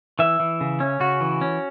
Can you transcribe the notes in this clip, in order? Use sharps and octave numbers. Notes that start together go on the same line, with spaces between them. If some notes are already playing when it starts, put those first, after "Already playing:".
E3 E5
E3
C#3
C#4
C#3 F#4
E3
C#4